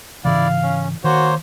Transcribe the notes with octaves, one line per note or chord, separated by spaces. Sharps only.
G#2 C#3 E3 E4 D5 F5
C#4
D#3 A#3 F#4 C5 C#5